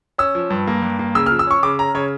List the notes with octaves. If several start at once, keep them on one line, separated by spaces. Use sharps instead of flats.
C#4 E6
F3
G2
A#3
G2
A#3
C#3 E6
F6
F3
E6
C#4 C#6
C#3 D6
C#4 A#5
C#3 C#5